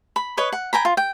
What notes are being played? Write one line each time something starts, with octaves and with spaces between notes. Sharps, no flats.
B5
B4 C#5 D#5
F#5
G5 G#5 A#5 B5
F4
G5